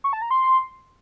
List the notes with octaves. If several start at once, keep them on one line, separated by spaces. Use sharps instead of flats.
C#6
A5
A#5
C6